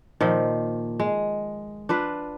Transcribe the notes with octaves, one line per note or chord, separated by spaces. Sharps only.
A#2 D#3 F3
G#3
D4 F4 B4